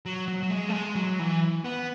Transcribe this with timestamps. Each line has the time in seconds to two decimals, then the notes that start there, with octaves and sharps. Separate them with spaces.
0.05 F#3
0.28 F#3
0.43 F#3
0.50 G#3
0.69 A3
0.73 G#3
0.96 F#3
1.19 E3
1.65 B3